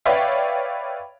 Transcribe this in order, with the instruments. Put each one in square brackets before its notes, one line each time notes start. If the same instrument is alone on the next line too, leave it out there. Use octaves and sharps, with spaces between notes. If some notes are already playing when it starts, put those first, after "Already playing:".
[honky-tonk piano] B4 C#5 D5 E5 F5 G5